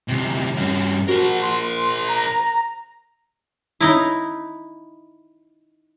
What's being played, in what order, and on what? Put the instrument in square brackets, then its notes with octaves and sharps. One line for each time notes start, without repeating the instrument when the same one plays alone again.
[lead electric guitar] D2 C3
G2 C#4
[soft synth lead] F#4 [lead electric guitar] A#4 C5
[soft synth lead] C6
A#5
[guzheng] D#4 E4